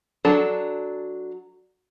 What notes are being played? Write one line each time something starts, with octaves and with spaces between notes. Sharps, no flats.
F#3 D4 A4